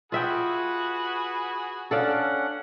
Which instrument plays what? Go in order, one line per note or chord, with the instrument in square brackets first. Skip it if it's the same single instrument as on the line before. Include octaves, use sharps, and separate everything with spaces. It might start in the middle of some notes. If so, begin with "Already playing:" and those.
[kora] F4 E5 G5 [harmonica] F#4 G#4 B4
[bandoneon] C#4 D4 F#5 [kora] A4 D5 F5